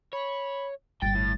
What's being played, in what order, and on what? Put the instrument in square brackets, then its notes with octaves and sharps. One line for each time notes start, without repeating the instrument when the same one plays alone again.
[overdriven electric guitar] C#5 [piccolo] B5
[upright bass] G1 G3 [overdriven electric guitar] G5 [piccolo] A6
[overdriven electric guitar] A2